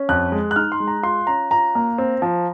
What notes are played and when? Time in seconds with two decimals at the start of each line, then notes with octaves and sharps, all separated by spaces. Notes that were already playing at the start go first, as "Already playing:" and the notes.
Already playing: C#4
0.09 F2 F#6
0.32 G#3
0.51 F#6
0.56 D#4 F6
0.72 C6
0.80 G#3
0.88 A#5
1.03 F4 C6
1.27 C#4 A#5
1.51 F4 A#5
1.75 A#3
1.98 C4
2.22 F3